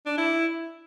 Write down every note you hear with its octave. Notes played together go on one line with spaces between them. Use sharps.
D4
E4